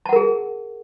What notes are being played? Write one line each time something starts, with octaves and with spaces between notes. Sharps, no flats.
G#4 A#4 F#5 A5